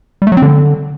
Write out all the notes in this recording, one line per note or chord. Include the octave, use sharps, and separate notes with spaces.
G3
A3
F#3
C4
D3